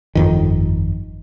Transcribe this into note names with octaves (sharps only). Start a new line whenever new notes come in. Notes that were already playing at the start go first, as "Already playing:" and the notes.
G1 F2 D#3